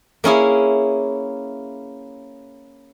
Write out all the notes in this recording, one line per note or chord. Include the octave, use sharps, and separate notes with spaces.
A#3 C#4 E4 G#4